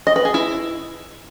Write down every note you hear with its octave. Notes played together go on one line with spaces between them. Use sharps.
D#5
B4
G#4
E4